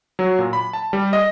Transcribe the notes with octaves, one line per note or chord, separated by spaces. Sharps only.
F#3
A#2
B5
A5
G3
D#5